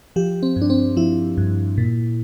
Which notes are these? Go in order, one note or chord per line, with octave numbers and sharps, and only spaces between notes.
F3 G4
C4
G2
D4
C4
F3 E4
G2
A#2